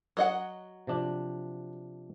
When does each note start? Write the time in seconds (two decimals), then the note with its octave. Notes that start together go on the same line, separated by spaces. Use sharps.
0.17 F#3 D#5 F#5
0.87 C3 F3 D4